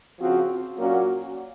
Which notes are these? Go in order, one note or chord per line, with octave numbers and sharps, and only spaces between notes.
C#3 F3 C4 F#4
A#2 F#3 A#3 C#4 F#4